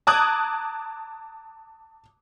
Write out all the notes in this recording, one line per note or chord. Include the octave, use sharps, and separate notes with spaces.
A5 A#5 D6 D#6 F#6 G#6